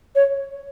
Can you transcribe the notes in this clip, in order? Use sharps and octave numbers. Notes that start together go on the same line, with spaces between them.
C#5